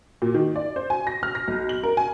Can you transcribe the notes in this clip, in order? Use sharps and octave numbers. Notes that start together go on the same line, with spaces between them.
A#2
D#3
D5
C5
G#5
A#6
F6
A#6
B1
F#7
A#4
G#5